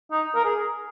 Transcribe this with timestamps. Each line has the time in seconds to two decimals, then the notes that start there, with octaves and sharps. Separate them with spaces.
0.12 D#4
0.35 A#4
0.45 G#4